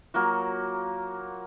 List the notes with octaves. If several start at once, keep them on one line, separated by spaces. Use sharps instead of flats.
F#3 A#3 F4 F#4